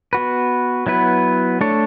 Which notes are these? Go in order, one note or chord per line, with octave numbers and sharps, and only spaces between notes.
B3 F#4 B4
F#3 B3 E4 B4
A3 D4 A4 C#5